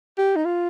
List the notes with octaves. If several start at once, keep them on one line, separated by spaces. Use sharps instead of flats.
G4
D#4
F4